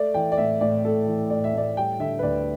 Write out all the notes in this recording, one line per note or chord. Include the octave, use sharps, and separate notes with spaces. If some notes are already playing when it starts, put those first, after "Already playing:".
Already playing: A3 D5
E3 G5
D5
A2 E5
A2 D5
A3 A4
E3
A2 D5
E5
A2 D5
G3 G5
D3 E5
B4
D2 D5